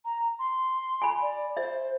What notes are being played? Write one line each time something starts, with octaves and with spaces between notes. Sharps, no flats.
A#5
C6
G#5 B5
D5
C5 E5